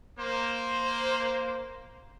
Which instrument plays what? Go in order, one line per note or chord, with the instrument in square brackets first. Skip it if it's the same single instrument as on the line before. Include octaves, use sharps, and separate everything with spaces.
[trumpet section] A#3 C5